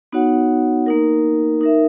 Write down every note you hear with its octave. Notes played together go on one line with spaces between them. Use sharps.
B3 D#4 F#4 C#5 F#5
A#3 D#4 A#4
D#4 A#4 E5